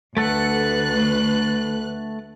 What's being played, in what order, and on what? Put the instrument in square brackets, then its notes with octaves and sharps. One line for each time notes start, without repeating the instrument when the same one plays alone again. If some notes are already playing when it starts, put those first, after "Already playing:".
[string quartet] D2 B4 F#6 [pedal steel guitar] A3 A4 F#5